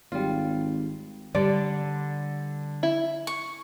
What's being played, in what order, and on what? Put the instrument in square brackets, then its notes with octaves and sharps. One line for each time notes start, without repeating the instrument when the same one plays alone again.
[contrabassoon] G#1 [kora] G3 F4
[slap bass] D3 [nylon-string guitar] G3 D5
[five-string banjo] E4
[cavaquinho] C#6